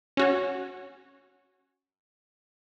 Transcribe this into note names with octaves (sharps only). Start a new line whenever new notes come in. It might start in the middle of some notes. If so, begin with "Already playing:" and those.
C#4 F#4 C#5